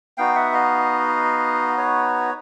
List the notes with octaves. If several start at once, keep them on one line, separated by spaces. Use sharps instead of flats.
B3 D#4 F#4 F5 G5
E5 F#5
D#5 F5
B4 C#5